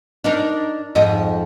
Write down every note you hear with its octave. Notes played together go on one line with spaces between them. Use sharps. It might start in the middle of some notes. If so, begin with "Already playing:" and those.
D4 D#4 A#4
F2 G#2 D#5